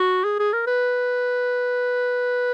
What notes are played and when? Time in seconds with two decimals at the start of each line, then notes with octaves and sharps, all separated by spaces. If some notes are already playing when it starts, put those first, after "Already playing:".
Already playing: F#4
0.24 G#4
0.39 G#4
0.53 A#4
0.67 B4